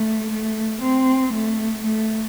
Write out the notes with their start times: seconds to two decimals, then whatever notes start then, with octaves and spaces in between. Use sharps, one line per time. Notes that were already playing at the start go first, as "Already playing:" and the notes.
Already playing: A3
0.30 A3
0.82 C4
1.33 A3
1.84 A3